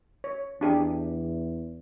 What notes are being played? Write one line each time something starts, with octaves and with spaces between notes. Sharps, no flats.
C#5
E2 D4 G4 G#4